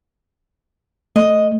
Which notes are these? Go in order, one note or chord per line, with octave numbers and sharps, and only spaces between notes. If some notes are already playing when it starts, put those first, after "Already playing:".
A3 D#5